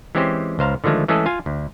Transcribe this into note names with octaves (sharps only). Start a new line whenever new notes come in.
E3 G#3 C4 C#4 G4 C5
C#2 C5 F5 A#5
D3 D#3 F3 G#3 A3
E3 G#3 A3 C#4 G#4 A4
F4 F5 G#5
D2